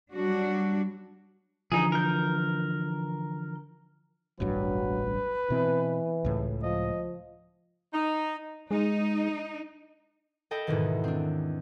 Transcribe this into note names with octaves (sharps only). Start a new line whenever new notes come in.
F#3 G3 D4 F#4
D3 E3 F3 D#4 G#4
A#4 G6
E1 A1 G2 F#3 B4
B2 E3 C4
C#2 A2
F3 D#5
D#4
G#3 D#4
A4 D#5 G5 A5 B5
E2 G#2 B2 D#3
C4 D4